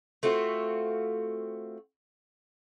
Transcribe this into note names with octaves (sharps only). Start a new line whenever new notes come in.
A3 C4 F4 F#4